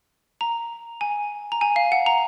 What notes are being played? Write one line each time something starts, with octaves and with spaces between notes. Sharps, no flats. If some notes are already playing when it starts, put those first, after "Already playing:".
A#5
G#5
A#5
G#5
F5
F#5
A#5